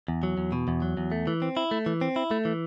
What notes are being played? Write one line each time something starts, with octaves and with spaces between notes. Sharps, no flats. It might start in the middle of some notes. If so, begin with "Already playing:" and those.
E2
F#3
E2
B2
E2
F#3
E2
A3
E3
C4
E4
A3
E3
C4
E4
A3
E3